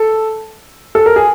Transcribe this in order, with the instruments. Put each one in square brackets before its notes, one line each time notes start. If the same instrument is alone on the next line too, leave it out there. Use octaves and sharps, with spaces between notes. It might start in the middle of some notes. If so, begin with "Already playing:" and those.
Already playing: [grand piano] A4
A4
A#4
G#4